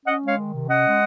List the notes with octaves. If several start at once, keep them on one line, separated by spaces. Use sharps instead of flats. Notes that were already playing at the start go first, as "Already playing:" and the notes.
C#4 D#5 F#5
G#3
C#5 F5
D#3
C3
C#4 D#5 F#5
G#3